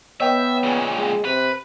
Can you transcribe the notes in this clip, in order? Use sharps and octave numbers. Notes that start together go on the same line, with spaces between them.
B3 C#5 D#5 E5 G5
A#2 C#3
G#3
C3 B4